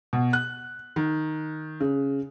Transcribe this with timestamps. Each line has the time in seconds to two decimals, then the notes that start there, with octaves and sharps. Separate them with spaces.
0.13 B2
0.33 F#6
0.96 D#3
1.80 C#3